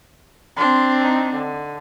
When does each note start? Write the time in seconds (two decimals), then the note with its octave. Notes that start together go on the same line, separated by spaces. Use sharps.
0.57 C4 D4 C6
1.02 D#4
1.34 D3